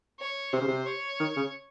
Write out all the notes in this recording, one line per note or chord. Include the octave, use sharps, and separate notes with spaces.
C#5
C3 C5
C#3
C3
C#5
D#3
C#3